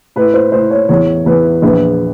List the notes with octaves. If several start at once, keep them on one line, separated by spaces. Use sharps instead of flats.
A2 B4
C5
A2 C5
C#5
E2 C#5
E2 B4
A#1 B4